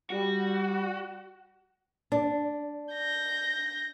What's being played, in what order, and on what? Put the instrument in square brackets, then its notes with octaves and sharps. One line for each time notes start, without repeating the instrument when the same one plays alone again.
[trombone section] G3 [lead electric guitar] F#4
[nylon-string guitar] D4
[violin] G6 A#6